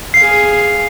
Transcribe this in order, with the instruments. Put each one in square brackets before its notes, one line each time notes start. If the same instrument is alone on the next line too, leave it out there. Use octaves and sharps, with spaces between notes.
[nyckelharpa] G#4 F5 [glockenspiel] C7